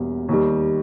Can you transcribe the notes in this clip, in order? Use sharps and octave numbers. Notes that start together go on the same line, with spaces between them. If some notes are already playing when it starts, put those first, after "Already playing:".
Already playing: E1 E2 B2 G3 A#3
D#2 D#3 G3